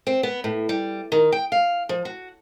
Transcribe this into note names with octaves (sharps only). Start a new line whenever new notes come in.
C4
B3
A2
G3
D#3
G5
F5
F3
F#4